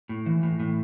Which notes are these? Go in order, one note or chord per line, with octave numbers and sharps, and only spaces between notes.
A2
E3
A2
A2